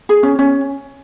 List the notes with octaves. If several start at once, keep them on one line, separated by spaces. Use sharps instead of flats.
G#4
C#4
C#4